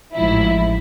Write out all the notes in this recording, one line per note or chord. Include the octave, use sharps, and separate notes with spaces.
A1 G#2 F3 E4